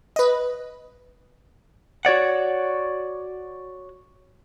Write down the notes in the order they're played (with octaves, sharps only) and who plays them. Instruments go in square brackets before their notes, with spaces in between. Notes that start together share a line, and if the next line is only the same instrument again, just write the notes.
[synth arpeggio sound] B4 D#5
[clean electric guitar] F#4 C#5 D5 F#5